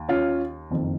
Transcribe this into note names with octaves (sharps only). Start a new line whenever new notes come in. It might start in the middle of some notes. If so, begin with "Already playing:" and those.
Already playing: D#2
C#4 F4
F#1 F2 D#3